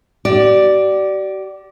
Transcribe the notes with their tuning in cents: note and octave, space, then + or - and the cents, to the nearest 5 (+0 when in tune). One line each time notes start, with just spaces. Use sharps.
G4 -45 D5 +0